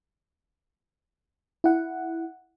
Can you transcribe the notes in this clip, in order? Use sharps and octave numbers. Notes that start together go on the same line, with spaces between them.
E4 F#5